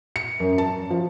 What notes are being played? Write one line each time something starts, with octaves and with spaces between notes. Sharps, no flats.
C#7
F#2
A5
F3